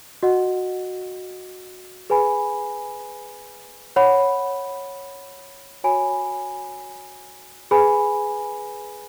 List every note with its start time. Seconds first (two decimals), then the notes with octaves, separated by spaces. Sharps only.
0.23 F#4 D#5 F#5
2.10 G#4 B4 G#5 B5
3.96 C#5 F#5 B5
5.84 F#4 C#5 G#5 B5
7.71 G#4 B4 G#5 B5